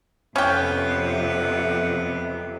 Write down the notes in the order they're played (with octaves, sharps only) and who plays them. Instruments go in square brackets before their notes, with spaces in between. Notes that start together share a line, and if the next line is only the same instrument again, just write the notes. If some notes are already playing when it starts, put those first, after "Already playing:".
[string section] F2 C3 [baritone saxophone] B3 [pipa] C#4 G5